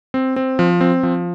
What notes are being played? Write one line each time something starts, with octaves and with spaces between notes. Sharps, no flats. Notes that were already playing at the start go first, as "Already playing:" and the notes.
C4
C4
F3
C4
F3